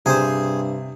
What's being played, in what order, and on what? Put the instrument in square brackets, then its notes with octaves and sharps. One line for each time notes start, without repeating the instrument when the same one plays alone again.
[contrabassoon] G2 [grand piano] C3 [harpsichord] G#4 C5